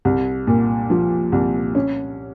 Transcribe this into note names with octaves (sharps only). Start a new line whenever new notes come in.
C2
A#2
F3
C2
C#4